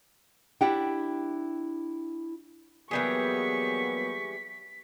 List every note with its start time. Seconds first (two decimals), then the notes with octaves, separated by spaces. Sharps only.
0.61 D4 E4 G4 F#5 G5
2.91 E3 F#3 G3 A#3 B3 G#4 C#6 B6